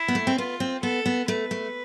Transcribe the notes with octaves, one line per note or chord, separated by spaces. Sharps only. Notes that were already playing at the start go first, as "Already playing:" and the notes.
Already playing: E4
B3
A3
C4
B3 F4
C4
B3 A4
B3
A3 B4
A3